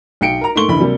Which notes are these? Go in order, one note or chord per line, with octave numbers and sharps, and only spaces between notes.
B1 G5 C#7 D7
A#4 A#5
G#2 A3 A#3 C6 C#6 G7
F#1 D2 E3 B5
C3 F#3 G3 A#3